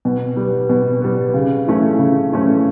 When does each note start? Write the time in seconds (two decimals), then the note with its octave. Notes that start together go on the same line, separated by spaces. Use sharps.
0.05 B2
0.37 G3 B3
0.69 B2
1.01 G3 B3
1.34 C#3
1.67 E3 A3 C#4
1.99 C#3
2.31 E3 A3 C#4